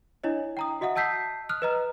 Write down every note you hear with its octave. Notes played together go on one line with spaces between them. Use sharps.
D4 E4 C#5 D#5
G5 A#5 D#6
F#4 D#5 E5 F#5 D#6
D#5 A5 E6 G6 B6 C7
D#6 F6 F#6
B4 D#5 A#5